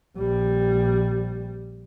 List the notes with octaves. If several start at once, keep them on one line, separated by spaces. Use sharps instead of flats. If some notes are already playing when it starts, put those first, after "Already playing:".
A#1 G3